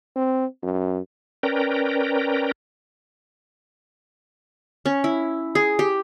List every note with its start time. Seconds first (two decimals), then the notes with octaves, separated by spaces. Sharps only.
0.16 C4
0.63 F#2
1.43 C#4 A#4 B4 D5 G5 A#5
4.86 C#4
5.04 E4
5.55 G#4
5.79 G4